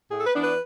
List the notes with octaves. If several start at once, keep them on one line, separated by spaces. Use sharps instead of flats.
A2 G#4
A4
B4
E3 B3 D4
B4